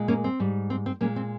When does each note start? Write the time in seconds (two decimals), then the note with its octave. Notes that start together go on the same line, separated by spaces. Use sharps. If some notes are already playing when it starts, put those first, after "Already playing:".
Already playing: A#2 G#3
0.08 A#3 C#4
0.24 C4
0.40 G#2 G3
0.70 C4
0.86 C4
1.01 A#2 G#3 A#3 C#4
1.16 C4